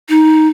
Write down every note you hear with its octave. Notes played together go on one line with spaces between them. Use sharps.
D#4